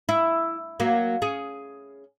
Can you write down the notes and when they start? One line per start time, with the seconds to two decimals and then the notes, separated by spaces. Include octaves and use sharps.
0.09 E4
0.80 F#3 A#3
1.22 C#4 G#4